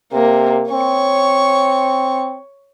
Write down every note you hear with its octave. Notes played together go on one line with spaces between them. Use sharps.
C3 A#3
C4 C#5 C#6